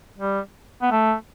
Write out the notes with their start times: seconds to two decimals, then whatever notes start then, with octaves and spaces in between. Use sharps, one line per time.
0.18 G3
0.82 B3
0.91 A3